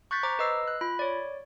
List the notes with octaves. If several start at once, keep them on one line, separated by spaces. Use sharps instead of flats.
C#6 F#6 G6 A6 B6
C5 A#5 D6
B4 D#5 E6 C7
F#6
F4 B5
C#5 D5